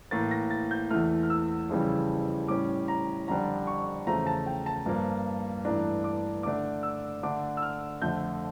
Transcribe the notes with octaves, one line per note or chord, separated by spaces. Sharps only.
A2 E3 A#3 A6
A#6
A6
G6
E2 E3 A3 F6
F6
E6
F2 C#3 E3 G3
A2 G3 C#4 D6
A#5
F2 D3 G3 D4 A#5
C#6
E2 C#3 F3 A3 A#5
A5
G5
A5
G2 F3 A#3
G2 E3 A3 D4 A#5
D6
D3 A3 D4 D6
E6
D3 A3 D4 D6
E6
F6
F2 D3 A3 G6